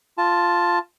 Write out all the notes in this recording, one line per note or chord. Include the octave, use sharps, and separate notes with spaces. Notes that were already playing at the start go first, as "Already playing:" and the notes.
F4 A5